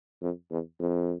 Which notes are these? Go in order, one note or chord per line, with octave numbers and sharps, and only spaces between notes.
F2
E2
F2